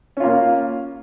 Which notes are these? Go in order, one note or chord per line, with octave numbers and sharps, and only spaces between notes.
A#3 C#4 F4